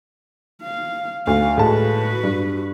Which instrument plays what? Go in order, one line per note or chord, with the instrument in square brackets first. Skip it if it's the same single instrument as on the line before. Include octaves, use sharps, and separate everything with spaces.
[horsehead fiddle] F5
[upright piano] D2 [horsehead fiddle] F5
[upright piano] A2 G#3 A5 [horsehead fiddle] F#4 B4
[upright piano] G2